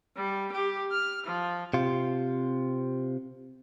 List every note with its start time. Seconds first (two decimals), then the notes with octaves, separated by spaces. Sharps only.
0.16 G3
0.51 G4
0.90 F6
1.25 F3
1.74 C3 F4